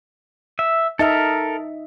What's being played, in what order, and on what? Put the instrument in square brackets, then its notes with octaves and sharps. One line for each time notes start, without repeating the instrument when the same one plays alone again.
[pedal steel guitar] E5
[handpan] D#4 D#5 E5 [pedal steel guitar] A4 A#4